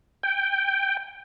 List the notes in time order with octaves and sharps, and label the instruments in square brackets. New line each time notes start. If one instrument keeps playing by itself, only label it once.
[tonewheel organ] G5